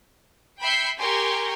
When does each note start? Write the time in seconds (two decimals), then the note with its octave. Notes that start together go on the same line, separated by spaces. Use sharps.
0.61 E5 G5 B5 G6 C7 C#7
0.99 G4 A#4 G5 G#5 C6 C#6